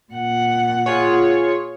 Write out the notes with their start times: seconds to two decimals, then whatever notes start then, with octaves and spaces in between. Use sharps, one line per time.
0.13 A#2 F#5
0.86 F4 G#4 C#5